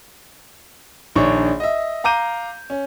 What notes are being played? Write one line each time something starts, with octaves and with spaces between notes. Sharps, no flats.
A#1 D#3 D4 C#5 C#6
D#5 E5
F5 A#5 D6 G6 D#7
C#4